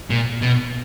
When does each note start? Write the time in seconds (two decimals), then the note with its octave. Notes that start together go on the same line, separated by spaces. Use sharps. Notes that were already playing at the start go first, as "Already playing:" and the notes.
0.10 A#2
0.42 B2